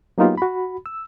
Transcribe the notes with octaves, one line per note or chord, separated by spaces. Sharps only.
F#3 A#3 B3 D#4 F4 G4
F#4 B5
E6